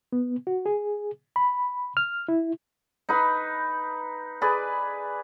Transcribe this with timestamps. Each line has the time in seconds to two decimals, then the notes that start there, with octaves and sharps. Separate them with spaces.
0.13 B3
0.47 F#4
0.66 G#4
1.36 B5
1.97 F6
2.28 E4
3.09 D#4 B4 B5
4.41 G#4 B4 D5